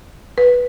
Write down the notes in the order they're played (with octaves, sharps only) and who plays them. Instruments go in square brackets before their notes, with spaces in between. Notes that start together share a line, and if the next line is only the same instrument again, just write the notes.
[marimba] B4